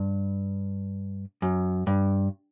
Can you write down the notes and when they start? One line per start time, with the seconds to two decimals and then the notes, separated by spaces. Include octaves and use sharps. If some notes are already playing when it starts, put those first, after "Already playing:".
Already playing: G2
1.42 F#2
1.87 G2